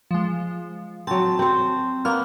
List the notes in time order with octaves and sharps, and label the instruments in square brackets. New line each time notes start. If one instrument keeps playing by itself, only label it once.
[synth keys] F3 G#3
[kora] F#3 C4 [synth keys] A5
[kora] C4 C5
[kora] A#3 B3 [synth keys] F6